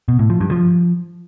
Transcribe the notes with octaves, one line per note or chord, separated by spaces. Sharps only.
B2
A2
F3
G2
F3